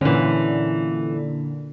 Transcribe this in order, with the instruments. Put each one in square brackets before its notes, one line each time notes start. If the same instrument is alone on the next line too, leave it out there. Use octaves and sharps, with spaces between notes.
[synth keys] A#2 D3 [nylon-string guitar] E3 C#4